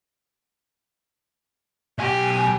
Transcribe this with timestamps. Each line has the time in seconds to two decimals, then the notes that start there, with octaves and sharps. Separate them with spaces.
1.98 B1 G4 G#5